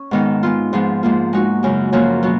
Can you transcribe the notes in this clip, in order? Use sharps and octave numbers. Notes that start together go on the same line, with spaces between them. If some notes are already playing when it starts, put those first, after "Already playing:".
Already playing: C#4
G#2 D#3 G#3 B3 D#4
G#3 B3 F4
G#2 F3 G#3 B3
G#2 F3 A#3
G#3 D#4 F#4
F#2 C#3 G#3
F#2 F3 A#3 C#4 F#4
B2 F#3 B3